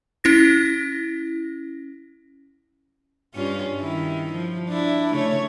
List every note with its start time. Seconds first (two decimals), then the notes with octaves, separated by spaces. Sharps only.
0.24 C#4 E4 A#6
3.35 G2 C#4 F4
3.81 D#3 E4
4.33 F3
4.69 D4 E4
5.12 C#3 A3 C#5